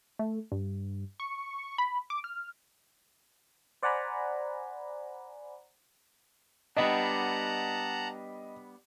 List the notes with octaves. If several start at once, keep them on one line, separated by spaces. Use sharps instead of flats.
A3
G2
C#6
B5
D6
F6
C5 D5 F#5 G#5 A#5 B5
G3 B3 D4 D#5 F#5 A5 A#5